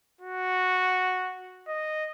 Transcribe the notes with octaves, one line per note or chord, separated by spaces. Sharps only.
F#4
D#5